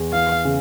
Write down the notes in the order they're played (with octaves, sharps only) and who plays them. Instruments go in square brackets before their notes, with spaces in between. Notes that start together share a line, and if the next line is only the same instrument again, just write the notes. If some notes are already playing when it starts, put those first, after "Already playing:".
Already playing: [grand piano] E2
[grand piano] E3 [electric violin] F5
[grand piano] C#3